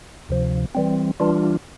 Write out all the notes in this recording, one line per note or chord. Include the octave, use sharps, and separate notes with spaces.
D2 C3 F3
E3 G3 C4
E3 G3 D4 F4